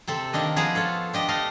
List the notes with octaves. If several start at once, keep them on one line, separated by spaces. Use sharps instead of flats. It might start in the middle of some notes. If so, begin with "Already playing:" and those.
C3 C4 A4
D#3 A#3 D4 D#5
F3 B3 G#4 F5 A#5
F4 A4 C#5
D4 G4 D#5
A3 A4 D#5 F5